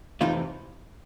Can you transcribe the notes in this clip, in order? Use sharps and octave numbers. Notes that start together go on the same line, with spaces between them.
F2 C3 E3 A3 D#4 F4